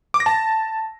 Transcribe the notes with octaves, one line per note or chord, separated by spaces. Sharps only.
D6
A#6
A5